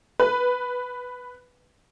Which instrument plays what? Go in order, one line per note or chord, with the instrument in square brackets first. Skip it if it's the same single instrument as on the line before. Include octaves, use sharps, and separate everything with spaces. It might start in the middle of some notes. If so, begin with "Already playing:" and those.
[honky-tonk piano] B4